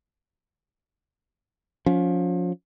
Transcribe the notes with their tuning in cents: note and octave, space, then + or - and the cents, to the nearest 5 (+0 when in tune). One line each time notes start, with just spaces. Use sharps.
F3 +30 C#4 +30